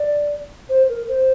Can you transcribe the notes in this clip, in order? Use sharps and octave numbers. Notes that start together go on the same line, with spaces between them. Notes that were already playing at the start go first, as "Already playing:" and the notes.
Already playing: D5
C5
A#4
C5